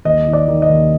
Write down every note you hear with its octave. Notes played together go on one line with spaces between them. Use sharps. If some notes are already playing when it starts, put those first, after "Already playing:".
D#2 D#5
D#3
D5
D#3
D#5
D#2